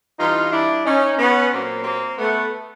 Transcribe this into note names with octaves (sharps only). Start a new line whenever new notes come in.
G2 E3 D#4 F4
D4 E4
C#4 D#4
B3 C#4
A#2 F#3 A#3 C4
A#3 C4
A3 B3